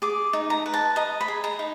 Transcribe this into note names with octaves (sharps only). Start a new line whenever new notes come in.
G#4 D6
D#4
A#5
B4
A5
D#5 A#5
B5
G#4
A#5
D#4